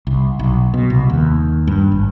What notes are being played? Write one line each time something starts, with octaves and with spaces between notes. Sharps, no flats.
C2
B1
B2
C2
D#2
G2
G#1